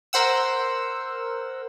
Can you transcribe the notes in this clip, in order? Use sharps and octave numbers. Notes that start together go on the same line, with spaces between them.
A#4 C5 F#5 E6